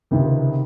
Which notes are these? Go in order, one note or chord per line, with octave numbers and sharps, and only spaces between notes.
C#2 C3 D#3